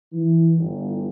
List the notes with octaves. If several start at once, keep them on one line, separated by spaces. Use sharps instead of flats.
E3
G1